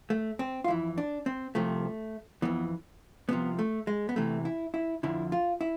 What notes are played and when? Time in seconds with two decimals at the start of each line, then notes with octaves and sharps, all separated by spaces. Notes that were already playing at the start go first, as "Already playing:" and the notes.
0.10 A3
0.39 C4
0.64 F4
0.68 F2 E3 E4
0.98 D4
1.26 C4
1.55 C2 C3 F3 A3
2.42 F2 E3 B3
3.29 C2 C3 F3 B3
3.59 A3
3.87 G#3
4.09 B3
4.16 E2 C3 E3 A3
4.45 E4
4.74 E4
5.03 F2 D3 F3 E4
5.32 F4
5.61 E4